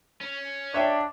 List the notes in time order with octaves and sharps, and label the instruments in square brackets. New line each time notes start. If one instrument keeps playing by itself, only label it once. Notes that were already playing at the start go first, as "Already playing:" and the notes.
[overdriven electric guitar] C#4
[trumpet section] D4 [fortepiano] C#5 E5 G5